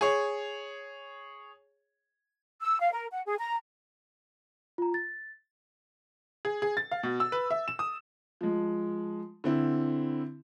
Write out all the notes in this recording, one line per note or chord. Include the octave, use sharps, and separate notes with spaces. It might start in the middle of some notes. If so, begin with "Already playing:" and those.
G#4 C#5
E6
F5
A#4
F#5
G#4
A#5
F4 A#5
A6
G#4
G#4
A6
F5
B2
E6
B4
E5
E7
D#6
F3 G#3
D3 C4 E4